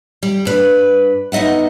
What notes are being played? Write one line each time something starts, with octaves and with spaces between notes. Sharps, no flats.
G3
G2 B4 D5
B3 D#4 D#5 E5 F#5